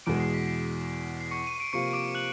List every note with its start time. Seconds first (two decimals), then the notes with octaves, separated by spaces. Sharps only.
0.06 E2 B2 G#3 D6 D7
0.20 C7
0.34 B6
0.48 C7
1.20 C7
1.31 C#6 C#7
1.47 D#7
1.60 D7
1.73 C3 F3 A#3 C#6 C#7
1.93 D6 D7
2.15 F#6 F#7